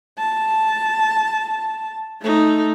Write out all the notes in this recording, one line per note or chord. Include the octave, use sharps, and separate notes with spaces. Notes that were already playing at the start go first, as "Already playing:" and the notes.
A5
A3 D#4